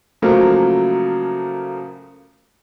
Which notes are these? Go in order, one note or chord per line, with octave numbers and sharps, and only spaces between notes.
C#3 F3 F#3 A3 A#3